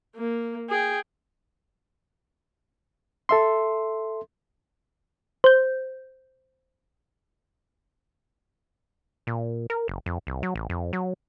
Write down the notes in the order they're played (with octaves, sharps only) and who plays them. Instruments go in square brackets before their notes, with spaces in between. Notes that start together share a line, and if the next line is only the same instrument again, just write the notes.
[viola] A#3
G#4 G5
[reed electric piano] A4 E5 C6
[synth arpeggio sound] C5 G6
[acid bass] A#2
A#4
F#1
F2
C2
F#3
A1
F2
F#3